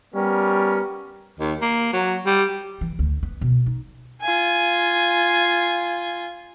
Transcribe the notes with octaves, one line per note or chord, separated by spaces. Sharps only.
G3 B3 C#4 A#4
D#2
A#3
F#3
G3
E3
D2
B3
B2
D#4
F4 G#5